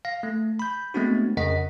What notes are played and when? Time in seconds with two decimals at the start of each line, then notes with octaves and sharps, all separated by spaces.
0.05 F5 A#6
0.23 A3
0.59 B5 G6
0.94 G#3 A3 B3 C4 D4 F#4
1.37 F2 C#3 A#4 D#5 F#5 B6